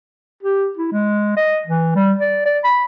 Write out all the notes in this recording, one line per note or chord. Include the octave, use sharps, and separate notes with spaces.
G4
E4
G#3
D#5
E3
G3
D5
D5
B5